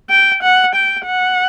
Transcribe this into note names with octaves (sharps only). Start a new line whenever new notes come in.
G5
F#5
G5
F#5